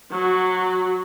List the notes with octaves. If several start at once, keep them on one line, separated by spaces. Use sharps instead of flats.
F#3 F#4